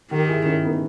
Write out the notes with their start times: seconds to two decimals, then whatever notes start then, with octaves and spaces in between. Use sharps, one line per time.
0.11 D#3 G4 A#4
0.29 E4 G#4
0.46 C#4 E4
0.63 B3 D#4